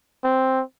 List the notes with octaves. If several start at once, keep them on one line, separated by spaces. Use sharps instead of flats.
C4